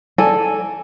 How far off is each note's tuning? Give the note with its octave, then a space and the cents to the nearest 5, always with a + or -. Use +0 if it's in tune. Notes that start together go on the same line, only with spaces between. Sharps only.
A4 +0 D5 +0 G#5 +0